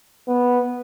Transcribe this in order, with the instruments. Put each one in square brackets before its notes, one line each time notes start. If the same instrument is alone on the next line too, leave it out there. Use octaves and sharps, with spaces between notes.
[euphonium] B3